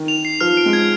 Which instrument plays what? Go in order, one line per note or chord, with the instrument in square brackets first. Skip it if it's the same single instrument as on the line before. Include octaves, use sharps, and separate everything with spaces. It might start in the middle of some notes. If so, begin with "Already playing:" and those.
Already playing: [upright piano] D#3
[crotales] F7
C7
[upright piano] F3 [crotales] F6
[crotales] D7
[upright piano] G#3
[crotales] G#6